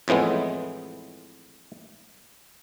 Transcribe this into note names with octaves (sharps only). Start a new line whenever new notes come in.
F2 A2 E3 G#3 B3